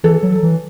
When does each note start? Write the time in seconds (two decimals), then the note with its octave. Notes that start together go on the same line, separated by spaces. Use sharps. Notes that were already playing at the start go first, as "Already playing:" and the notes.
0.04 E3 A4
0.23 F#3
0.43 E3